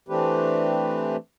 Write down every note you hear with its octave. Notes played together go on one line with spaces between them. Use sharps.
E3 A3 C4 D4 G4 B4